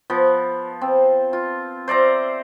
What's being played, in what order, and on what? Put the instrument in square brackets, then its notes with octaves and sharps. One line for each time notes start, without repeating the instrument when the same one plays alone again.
[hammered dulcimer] F3 B3
C4
F4
C5 D5 E5 A#5